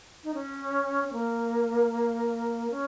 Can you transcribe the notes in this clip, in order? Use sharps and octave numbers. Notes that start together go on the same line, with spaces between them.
D#4
C#4
C#4
A#3
C#4